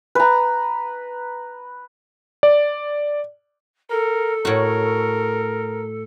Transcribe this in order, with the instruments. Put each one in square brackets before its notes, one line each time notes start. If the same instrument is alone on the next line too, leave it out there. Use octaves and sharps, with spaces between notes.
[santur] B4 A#5
[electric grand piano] D5
[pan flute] A4 [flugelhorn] A#4
[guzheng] A2 F#4 [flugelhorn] A#4